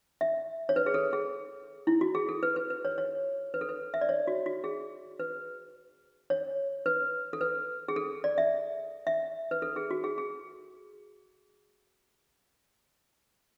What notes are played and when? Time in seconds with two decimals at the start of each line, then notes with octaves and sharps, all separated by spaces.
0.21 E5
0.69 C#5
0.76 B4
0.86 G#4
0.94 A4
1.13 G#4
1.87 E4
2.01 F#4
2.15 G#4
2.29 A4
2.43 B4
2.56 B4
2.70 B4
2.85 C#5
2.98 C#5
3.54 B4
3.61 A4
3.69 B4
3.94 E5
4.01 D5
4.09 C#5
4.27 F#4
4.46 F#4
4.64 G#4
5.20 B4
6.30 C#5
6.86 B4
7.33 A4
7.41 B4
7.88 G#4
7.96 A4
8.24 D5
8.38 E5
9.07 E5
9.51 B4
9.62 A4
9.76 G#4
9.91 F#4
10.04 G#4
10.18 G#4